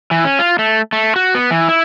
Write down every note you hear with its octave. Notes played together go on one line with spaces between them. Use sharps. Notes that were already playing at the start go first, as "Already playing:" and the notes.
E3
C#4
F4
A3
A3
F#4
B3
E3
E4